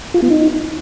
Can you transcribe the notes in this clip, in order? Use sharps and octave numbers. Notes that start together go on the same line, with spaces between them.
F4
B3
D#4